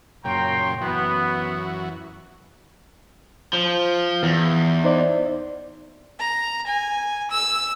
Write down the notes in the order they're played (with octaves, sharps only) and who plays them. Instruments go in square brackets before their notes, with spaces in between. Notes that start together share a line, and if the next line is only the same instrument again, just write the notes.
[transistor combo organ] F#2 A#2 C#3 [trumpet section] G5 A#5 C6
[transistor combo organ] F#2 E3 F#4 [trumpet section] B3
[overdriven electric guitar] F3
[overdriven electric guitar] E2 [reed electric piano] E3
[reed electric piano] D#4 C5 D5
[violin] A#5
G#5
E6